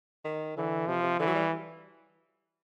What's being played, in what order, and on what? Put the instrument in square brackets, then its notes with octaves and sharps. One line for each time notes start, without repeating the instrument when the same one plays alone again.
[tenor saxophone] D#3
[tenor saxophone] D3 [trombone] E3
[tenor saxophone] C3 [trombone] F3
[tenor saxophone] C3
[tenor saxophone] D3 [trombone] E3
[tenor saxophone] F#3
G3